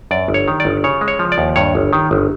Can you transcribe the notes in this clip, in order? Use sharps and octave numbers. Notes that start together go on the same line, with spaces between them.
F#2 D5
G1
C#5
D#3
D5
G1
C#3 C#5
G#3
C#5
F3
D5
D#2
G2 C#5
G1
D#3
G1